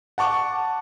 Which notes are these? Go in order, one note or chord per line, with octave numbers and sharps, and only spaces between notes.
F#5 A5 C#6 D6